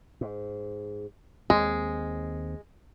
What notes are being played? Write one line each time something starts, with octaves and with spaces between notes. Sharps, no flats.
G#2
D#2 G#3 C4